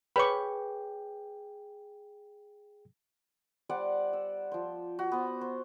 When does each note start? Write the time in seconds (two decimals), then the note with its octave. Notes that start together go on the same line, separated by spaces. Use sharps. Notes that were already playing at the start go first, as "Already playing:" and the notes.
0.16 G#4 B4 C#5 G5 B5 C#6 D6
3.69 G3 C5 D5 F#5
4.13 E6
4.52 F3 C5
4.99 F#4
5.12 B3 C5
5.41 C5